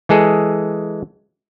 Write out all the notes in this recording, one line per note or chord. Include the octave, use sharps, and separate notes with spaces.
E3 G#3 G#4 A4